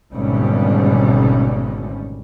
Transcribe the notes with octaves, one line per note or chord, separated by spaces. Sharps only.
G#1 D2 B2 G3 C#4